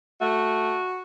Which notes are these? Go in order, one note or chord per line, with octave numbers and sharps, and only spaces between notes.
A3 F#4